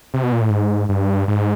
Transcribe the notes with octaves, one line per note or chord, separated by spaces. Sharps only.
C3
B2
A#2
A2
G#2
G2
G#2